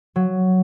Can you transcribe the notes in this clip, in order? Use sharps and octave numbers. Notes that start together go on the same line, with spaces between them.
F#3